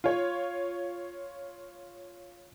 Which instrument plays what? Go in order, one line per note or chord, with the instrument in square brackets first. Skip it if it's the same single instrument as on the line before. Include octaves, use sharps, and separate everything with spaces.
[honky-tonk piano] F4 C#5